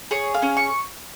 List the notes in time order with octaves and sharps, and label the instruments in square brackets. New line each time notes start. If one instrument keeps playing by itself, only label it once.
[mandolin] G#4 C#5
F5
C#4
C#6